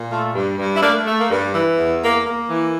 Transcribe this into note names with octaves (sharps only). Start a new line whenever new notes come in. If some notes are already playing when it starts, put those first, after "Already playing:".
Already playing: A#2
A3 F4 A4
G2
G2
E4
A3 A#3 D4
A3
A#3
G2
E3
E2
A#3
A#3
E3